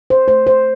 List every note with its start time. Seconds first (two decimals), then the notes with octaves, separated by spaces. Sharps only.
0.10 C5
0.28 A3 C5
0.47 C5